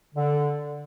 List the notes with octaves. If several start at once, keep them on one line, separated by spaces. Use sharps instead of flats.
D3